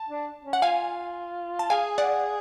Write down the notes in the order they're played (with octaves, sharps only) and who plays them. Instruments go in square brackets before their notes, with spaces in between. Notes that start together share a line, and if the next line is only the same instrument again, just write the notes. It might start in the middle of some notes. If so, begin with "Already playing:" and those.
Already playing: [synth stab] A5
[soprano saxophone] D4
C#4
[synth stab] F#5
[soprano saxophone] F4 [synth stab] F5 G#5
[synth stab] A5
[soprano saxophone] G#4 [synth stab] F5 G#5
[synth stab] D5 F#5